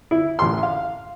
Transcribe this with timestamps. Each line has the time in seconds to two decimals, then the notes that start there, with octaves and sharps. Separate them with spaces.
0.11 E4
0.39 A1 C6
0.63 F5